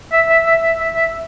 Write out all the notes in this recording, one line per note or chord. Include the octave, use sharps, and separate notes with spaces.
E5
E5
E5
E5
E5
E5